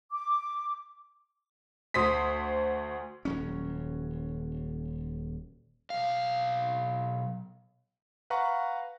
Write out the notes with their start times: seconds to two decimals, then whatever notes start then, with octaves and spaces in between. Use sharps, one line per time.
0.12 D6
1.94 D2 C5 D#6 B6
3.25 D#1 F#3 C#4
5.90 B1 F5
8.30 B4 F5 F#5 A#5 C#6